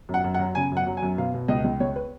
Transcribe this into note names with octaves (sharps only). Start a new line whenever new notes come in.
F#2
F#5
F#2
F#5
F#3
C#3 G#5
F#2 F#5
F#3
G#5
F#2
B2 F5
B2
C#2 D#5
C#2
C#2 C#5
B4